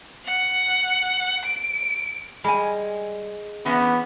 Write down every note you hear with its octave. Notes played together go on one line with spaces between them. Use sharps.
F#5
D7
G3 G#3 G#5
E3 B3 C#4